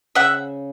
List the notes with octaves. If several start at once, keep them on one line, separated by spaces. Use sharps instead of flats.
C#3 E5 F#5